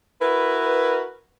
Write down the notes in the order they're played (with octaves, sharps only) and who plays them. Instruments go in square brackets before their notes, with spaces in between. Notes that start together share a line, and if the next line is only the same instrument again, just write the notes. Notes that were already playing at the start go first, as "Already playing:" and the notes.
[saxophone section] E4 F#4 A#4 B4